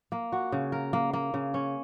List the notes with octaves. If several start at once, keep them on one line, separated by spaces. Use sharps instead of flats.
A#3
F#4
C#3
A#4
A#3
A#3
C#3
C#4